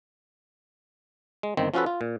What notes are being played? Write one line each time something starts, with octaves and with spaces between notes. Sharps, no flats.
G#3
G1 D#3 C4
F3 C#4 F4 F#4 A4 B4
F4
A#2